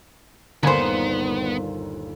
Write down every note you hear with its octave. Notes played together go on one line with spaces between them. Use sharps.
G1 D#2 A#2 D3 B3 C5 G#5 B5